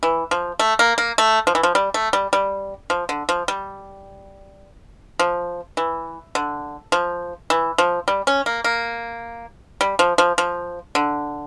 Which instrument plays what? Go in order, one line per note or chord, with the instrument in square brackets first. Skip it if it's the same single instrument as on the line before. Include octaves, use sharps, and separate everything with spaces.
[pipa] E3
F3
A3
A#3
A#3
A3
F3
E3
F3
G3
A3
G3
G3
F3
D3
F3
G3
F3
E3
D3
F3
E3
F3
G3
C#4
A#3
A#3
G3
F3
F3
F3
D3